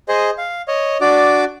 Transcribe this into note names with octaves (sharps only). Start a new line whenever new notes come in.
G#4 C5 D#5
F5
C#5 D#5
D4 F#4 D5 D6